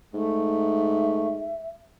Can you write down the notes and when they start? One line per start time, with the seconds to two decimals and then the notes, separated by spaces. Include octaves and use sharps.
0.14 G#2 A3 E5